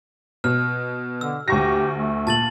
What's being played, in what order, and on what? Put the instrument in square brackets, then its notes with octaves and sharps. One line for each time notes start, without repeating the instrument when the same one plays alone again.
[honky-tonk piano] B2 [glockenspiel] F6
[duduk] D3 [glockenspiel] E6
[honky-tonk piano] D2 C#6 A#6 [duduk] G4
[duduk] A3
[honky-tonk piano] A#2 [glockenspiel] A5 A6 F#7